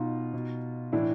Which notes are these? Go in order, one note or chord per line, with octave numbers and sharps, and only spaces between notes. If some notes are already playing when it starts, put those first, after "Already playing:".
Already playing: B2 D#4 F4
B2
A2 E3 D4 E4